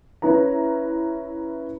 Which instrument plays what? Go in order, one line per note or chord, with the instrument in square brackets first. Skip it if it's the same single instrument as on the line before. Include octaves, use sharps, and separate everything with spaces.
[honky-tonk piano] C#4 E4 B4 A#5